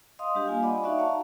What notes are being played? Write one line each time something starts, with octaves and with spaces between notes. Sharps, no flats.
D#5 F5 C6 D#6
G3 D4 G4 F5
A#3 F4 G#5
D5 D#5 F#5 B5 D6
D#4 F#4 D5 E5 F5 C#6
C#5 F5 F#5 A5 A#5